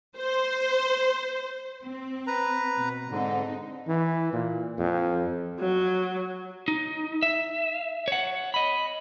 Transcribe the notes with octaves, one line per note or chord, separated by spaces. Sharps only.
C5
C4
B4 A#5
B2
G#2 D3 C4 D#4
E3
A#2
F2
F#3
D#4
E5
C#5 F#5
D#5 B5